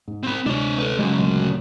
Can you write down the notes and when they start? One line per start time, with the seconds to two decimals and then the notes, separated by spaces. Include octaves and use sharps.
0.08 G#2
0.23 C4 B5
0.46 D2 C3 G#3 D4 C#5
0.78 A4 B4
0.99 C#3 F#3 G#3
1.19 D2 A#2 G#3